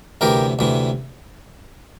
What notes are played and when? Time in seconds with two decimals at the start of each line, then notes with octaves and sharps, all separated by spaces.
0.21 D2 C3 E3 G4 A#4
0.59 D2 C3 E3